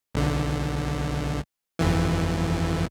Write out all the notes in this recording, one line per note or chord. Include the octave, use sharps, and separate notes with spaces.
B1 D3
G1 F2 E3